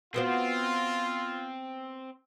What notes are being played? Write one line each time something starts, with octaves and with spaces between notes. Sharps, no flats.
B3 C4 F4 F#4 C5